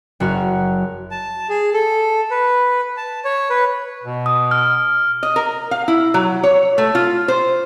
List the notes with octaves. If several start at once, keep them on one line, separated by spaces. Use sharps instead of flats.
F#1 F#4 A#4 F6
A5
G#4
A4
B4
A5
C#5
B4
B2
D#6
F6
D#5
A#4
F5
E4
F#3
C#5
A3
F4
C5